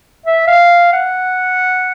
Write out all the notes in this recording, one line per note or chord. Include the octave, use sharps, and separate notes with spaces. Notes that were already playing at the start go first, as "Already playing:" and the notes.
E5
F5
F#5